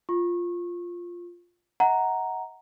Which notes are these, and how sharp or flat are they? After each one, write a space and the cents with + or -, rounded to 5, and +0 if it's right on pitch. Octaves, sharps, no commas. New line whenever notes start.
F4 +0 C#6 -25
D#5 +35 F#5 +0 A#5 +0